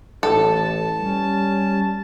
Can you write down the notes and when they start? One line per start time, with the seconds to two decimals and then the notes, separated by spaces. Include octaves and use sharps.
0.23 A1 A4 A5
1.00 G3 C#4